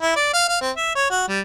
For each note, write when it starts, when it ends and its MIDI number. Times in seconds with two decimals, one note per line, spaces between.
0.02 0.16 64
0.16 0.29 74
0.33 0.46 77
0.48 0.57 77
0.61 0.71 60
0.77 0.95 76
0.95 1.09 73
1.10 1.23 66
1.28 1.40 55